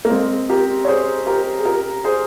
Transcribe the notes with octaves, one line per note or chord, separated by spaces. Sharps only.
A#3
G#3 C4
G4 A#4
C#5
G#4 C5
G4 A#4
G#4
G4 A#4
G#4 C5